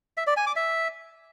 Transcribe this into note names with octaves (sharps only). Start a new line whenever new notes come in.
E5
D5
G#5
D6
E5